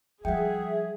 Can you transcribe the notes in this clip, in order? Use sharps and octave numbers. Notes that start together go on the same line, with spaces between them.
F3 G3 G#4 E5 F#5 G5